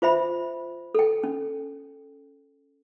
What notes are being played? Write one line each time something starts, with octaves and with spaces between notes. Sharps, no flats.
F4 C5 E5 B5
A4 G5
C#4